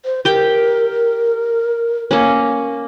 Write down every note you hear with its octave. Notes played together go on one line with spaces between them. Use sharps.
C5
G4 A#4 G5
A#3 C#4